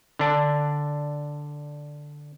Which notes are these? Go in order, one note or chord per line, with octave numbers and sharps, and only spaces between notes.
D3 D4